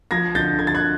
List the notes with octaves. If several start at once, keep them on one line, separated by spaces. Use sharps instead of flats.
F3 G#6 A#6
D3 G6 A6
D3 G#6
A6
F#6 G#6